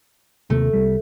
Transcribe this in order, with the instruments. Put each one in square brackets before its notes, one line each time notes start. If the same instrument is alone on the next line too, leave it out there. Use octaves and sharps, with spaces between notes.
[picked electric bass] D#2 C3 A#3 [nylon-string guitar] A3
[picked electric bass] C2 G3